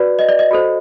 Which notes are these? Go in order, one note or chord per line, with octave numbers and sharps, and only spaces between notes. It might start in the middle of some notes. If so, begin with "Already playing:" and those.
Already playing: F#4 B4 D5
D#5
D5
D#5
F#4 A4 C5